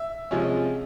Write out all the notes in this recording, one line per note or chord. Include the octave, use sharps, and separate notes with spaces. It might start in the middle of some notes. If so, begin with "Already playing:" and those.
Already playing: E5
C3 F3 G#3 C#4